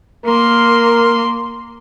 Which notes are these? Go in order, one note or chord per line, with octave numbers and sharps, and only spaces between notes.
A#3 A#4 C6